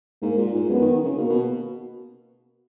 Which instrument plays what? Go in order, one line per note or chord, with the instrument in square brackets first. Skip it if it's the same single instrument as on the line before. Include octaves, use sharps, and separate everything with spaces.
[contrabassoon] G#2 [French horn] A#3
[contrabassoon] A#2
G#2
[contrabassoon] F#2 [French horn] B3
[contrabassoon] D#3
D#3
C#3
[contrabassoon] B2 [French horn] A#3
[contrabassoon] B2